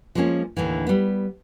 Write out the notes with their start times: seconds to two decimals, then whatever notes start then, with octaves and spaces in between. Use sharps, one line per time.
0.15 F3 G#3 A#3 B3 C#4
0.56 D#2 A2 D3 E3
0.87 G3 B3